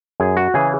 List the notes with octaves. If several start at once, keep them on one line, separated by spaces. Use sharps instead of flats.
F#2 G#4
F#4
C#3 E3 G#4